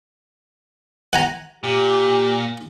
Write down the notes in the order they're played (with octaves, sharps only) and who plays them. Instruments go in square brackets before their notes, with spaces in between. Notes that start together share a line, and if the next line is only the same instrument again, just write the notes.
[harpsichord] F#5 G#5 A#5
[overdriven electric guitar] A#2 [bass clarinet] G4